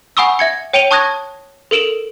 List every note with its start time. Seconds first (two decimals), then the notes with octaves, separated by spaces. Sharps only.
0.17 F#5 G#5 B5 C#6 D#6 E6
0.39 E5 G#6 C#7
0.73 C#5 G5 D7 D#7 F7 G7
0.91 A5 C#6 D#6 F#6 G#6 A#6
1.71 A4 A#4 D7 E7 F#7